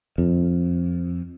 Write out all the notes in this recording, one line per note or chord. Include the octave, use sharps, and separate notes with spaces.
F2